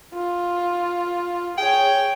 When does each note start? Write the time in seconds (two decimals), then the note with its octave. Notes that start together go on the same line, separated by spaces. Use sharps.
0.14 F4
1.58 G#4 C#5 G5